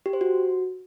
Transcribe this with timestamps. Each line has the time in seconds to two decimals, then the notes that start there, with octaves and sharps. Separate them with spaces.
0.06 G4
0.13 C5
0.21 F#4